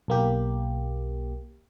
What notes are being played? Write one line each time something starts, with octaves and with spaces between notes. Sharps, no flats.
B1 A#3 G4